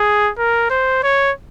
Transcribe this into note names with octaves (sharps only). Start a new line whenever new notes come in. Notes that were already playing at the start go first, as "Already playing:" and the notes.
Already playing: G#4
A#4
C5
C#5